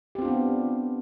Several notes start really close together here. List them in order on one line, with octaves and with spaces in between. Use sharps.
G4 C4 F4 D4 B3